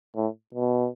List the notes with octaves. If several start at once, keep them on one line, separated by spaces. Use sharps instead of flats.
A2
B2